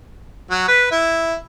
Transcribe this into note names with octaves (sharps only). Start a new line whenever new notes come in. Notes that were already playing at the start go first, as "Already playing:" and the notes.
F#3
B4
E4